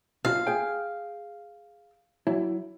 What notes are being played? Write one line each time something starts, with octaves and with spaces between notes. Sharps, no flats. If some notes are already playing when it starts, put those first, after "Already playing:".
B1 F4 F5
G#4 G5
F#3 E4